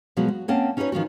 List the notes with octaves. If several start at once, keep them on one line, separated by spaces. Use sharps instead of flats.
B2 F3 F#3 G#3 B3 F#4
F#4
A#3 C4 C#4 F#5 A5
C#4 D#4 F#4 A#4 B4 C#5
D#3 F3 C#4 F#4